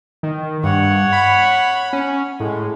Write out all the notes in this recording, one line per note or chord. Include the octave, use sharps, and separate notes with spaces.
D#3
G2 C#5 F#5
B5
C#4
A2 G#3